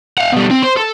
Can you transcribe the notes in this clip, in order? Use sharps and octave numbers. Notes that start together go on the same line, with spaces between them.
F5 F#5
B2 G3
C4
C5 C6
A4